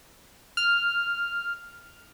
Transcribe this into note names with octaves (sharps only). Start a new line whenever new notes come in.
F6